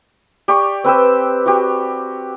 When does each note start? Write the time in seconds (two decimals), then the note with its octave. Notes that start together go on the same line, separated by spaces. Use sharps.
0.48 G4 D5 C#6
0.84 C4 B4 G5 E6
1.46 F#4 G4